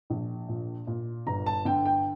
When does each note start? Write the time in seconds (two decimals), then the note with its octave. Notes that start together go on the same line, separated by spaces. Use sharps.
0.10 A#1
0.49 A#2
0.87 A#2
1.27 G1 A#5
1.46 A5
1.65 D3 G5
1.86 G5